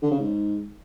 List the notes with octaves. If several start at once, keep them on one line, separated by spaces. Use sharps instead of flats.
D3
C#3
G#2